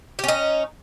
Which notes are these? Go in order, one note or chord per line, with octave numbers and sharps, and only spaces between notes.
C#4 D#4 G4